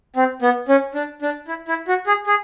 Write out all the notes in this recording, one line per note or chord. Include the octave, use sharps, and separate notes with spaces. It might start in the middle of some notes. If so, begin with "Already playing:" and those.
C4
B3
C#4
D4
D4
E4
E4
F#4
G#4
G#4